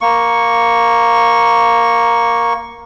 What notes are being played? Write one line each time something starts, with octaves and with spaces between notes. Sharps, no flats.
A#3 C#6